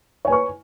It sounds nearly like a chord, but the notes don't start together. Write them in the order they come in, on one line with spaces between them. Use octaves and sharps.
C#5 G#5 B4 C#6